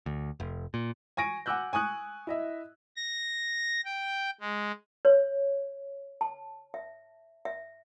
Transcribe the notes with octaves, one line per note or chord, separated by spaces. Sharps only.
D2
F1
A#2
G#5 C#6 A#6 D7
F#5 G#5 D6 E6 F#6 G6
G#5 C#6 D#6 F#6
E4 D#5 E5
A#6
G5
G#3
C#5
A5
E5
E5